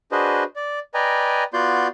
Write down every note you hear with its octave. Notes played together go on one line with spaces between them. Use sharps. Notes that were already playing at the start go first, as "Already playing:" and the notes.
D4 F#4 G#4 B4 C5 D#5
D5
B4 D5 D#5 G5 G#5 A#5
B3 F4 F#4 D5 C6 G6